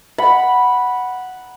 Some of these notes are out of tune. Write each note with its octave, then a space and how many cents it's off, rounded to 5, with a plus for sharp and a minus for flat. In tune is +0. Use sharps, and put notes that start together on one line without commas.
F#5 +0 B5 -10